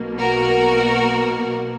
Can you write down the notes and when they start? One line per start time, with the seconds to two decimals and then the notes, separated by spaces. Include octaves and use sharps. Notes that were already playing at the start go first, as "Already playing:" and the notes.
Already playing: B1 B2 A#3
0.19 F#4 A#4